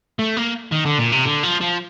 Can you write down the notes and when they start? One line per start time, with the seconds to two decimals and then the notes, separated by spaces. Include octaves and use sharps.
0.19 A3
0.37 A#3
0.72 D#3
0.86 D3
0.99 A#2
1.12 C3
1.25 D3
1.43 F3
1.61 F3